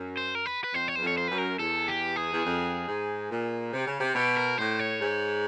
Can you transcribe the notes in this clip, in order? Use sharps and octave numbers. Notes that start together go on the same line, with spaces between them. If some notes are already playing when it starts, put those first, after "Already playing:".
Already playing: F#2
C5
A#4
B4
B4
F2 C5
C#5
E2 C5
F2
C#5
C5
F#2 B4
A#4
E2 A4
G4
G#4
E2
F2
G#2
A#2
C3
C#3
C3
B2 G4
A#4
A2 C5
C#5
G#2